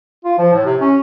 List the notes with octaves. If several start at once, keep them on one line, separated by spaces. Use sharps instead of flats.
F4
F3
A2
C3
C#4